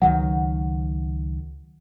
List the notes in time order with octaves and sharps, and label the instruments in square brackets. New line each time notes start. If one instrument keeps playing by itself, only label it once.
[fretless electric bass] C#2 D#3 F#3 [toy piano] F#5